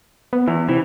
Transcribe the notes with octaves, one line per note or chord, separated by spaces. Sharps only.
B3
E2 E3
C3 E3